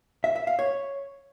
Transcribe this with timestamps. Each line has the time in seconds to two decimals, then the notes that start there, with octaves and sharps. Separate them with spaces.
0.24 E5
0.36 E5
0.47 F5
0.59 C#5